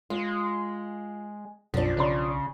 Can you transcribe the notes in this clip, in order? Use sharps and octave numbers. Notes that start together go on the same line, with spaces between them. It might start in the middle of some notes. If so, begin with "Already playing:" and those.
G#3 F4
B1 F#2 F3 D4
C#3 C#5 D5 C6